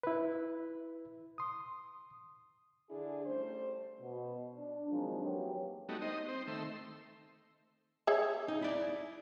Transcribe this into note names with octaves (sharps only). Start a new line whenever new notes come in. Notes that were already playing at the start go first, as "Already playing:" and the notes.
E4 B4
C6 D#6
D3 D4 E4 G#4
G3 A3 C#4 C5
B2
D4
D#3 F3 F#3 G#3 C4 D4
E2 F#3 A#3 G4 B4 C#5
G3 A3 B3 D#4 F#4
D#4 C5 D#5
C4 C5
D#3 A3 E5 C6
G#4 C#5 E5
D#4
E4 D5